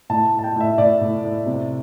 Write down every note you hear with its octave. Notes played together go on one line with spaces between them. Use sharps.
A2 A5
A2
A5
G5
A2 E5
A2 D5
A2
A2
C3